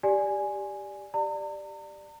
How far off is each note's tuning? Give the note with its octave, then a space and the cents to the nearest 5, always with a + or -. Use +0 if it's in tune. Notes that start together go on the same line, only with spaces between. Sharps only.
G4 +0 D5 +0 G#5 +0
G4 +0 D5 +10 A#5 -40